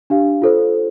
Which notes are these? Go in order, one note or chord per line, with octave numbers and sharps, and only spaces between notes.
D4 G4 F5
F4 A4 C5